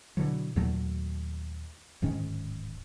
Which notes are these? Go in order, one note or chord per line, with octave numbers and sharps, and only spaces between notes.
B2 D3 E3 F#3
D#2 A#2 F#3 A3
D1 G#2 D#3 C#4